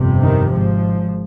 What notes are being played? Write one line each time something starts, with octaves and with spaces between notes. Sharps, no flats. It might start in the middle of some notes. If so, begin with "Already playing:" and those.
Already playing: G1 F2 C3
D#3
G#1 G#2 F3